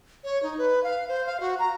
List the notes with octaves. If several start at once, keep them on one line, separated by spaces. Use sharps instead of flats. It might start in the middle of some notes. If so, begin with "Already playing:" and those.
C#5
D#4
B4
F5
C5
F5
F#4
A#5